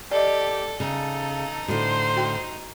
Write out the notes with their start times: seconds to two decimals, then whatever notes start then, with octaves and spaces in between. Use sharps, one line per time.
0.11 G4 A4 D5 D#5
0.80 C#3 D#4 A4
1.68 A2 D3 F#4 C5
2.16 F#4 G5